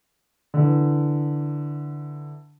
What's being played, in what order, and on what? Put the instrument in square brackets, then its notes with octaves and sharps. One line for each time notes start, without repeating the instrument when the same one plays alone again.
[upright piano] D3 E3